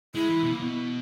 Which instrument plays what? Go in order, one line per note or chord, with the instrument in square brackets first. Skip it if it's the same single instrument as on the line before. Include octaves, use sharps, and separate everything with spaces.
[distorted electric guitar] G#3 [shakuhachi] E4
[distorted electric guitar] E3
B2
A#2
B2